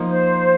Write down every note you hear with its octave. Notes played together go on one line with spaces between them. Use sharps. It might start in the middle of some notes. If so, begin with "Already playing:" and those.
Already playing: F3 A#3 D#4
C5